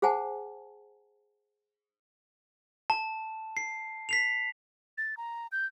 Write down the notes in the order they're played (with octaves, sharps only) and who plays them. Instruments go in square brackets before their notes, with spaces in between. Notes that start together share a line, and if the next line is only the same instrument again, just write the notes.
[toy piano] G#4 C5 F#5 G#5 A5
[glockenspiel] A5
C7
B6 C7 F7
[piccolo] A6
A#5
G6